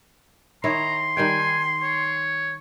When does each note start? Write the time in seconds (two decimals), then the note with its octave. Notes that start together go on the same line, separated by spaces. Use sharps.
0.64 D#3 E4 C#5 A#5 C6
1.17 D#3 G3 G5 G#5
1.83 C#5